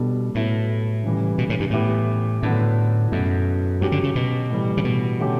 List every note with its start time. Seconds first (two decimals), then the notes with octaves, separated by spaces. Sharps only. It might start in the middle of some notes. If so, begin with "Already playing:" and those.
Already playing: B2 G3 D4 A4
0.35 A2 F#3 B3 E4 A4
1.04 C#3 E3 G3
1.38 B2
1.50 A2
1.60 G2
1.70 A2 E3 B3 E4 G4
2.43 A2 D3 F#3 B3 D4
3.12 F#2 B2 A3 E4
3.81 G2 F#3 C#4 G4
3.92 D3
4.03 C#3
4.15 B2
4.50 A2 E3 G3
4.77 C#3
4.84 B2
5.20 D3 A3 C#4 G4